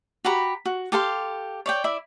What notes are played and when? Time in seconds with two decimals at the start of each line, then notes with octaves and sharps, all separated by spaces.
0.25 F#4 G4 A#5 B5
0.65 F#4
0.92 G4 A4 F5 C6
1.66 C#5 D5 G5
1.84 E4 D5 E5